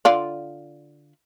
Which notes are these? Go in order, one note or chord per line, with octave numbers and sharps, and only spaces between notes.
D3 F4 D5